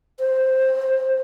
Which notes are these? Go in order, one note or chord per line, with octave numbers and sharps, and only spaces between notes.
C5